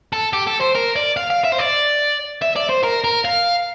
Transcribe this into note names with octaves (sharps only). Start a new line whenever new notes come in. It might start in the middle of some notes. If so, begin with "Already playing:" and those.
A4
G4
A4
C5
A#4
D5
F5
F5
E5
C5
D5
E5
D5
C5
A#4
A#4
F5